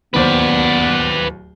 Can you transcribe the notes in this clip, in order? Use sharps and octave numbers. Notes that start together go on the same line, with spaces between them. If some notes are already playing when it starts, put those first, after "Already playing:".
D1 D#2 B3 B4 C5 D5